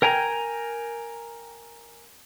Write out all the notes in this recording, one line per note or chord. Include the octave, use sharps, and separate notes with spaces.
A#4 G5 G#5 A#5